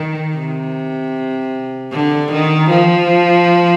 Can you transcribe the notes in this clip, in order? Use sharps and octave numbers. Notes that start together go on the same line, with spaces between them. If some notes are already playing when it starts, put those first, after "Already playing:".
Already playing: D#3
C3
D3
D#3
F3